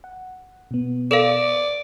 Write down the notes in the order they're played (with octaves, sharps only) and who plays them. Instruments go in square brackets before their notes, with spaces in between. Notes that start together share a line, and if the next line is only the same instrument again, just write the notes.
[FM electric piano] F#5
B2 B3
[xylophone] A4 A#4 F5 [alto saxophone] D5